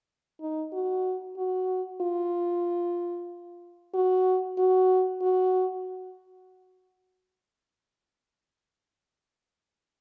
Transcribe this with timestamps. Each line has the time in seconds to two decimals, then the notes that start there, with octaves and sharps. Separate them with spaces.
0.40 D#4
0.73 F#4
1.37 F#4
2.01 F4
3.94 F#4
4.58 F#4
5.22 F#4